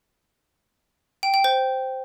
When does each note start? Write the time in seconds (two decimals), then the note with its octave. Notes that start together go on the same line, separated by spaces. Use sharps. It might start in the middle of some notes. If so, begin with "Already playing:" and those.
1.23 G5
1.34 G5
1.44 C5